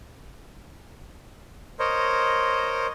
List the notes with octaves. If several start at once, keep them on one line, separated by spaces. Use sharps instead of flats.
A#4 C5 C#5 D#5